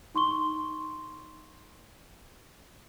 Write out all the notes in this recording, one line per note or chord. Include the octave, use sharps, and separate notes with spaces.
D#4 C6 C#6 G7